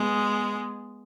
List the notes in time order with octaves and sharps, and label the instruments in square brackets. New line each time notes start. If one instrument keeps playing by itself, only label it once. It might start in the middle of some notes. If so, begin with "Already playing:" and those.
Already playing: [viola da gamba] G#3 B3